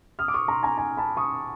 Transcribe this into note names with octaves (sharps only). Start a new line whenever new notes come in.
D#6 F6
D6
C#6 D#6
A#5 C6
G#5 A#5
G#5 A#5
A5 B5
C#6 D#6